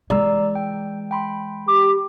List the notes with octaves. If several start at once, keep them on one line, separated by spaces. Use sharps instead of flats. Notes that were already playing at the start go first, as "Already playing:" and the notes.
E3 G#3 D5 A#5 E6
G5
G5 B5 C6
G4 D6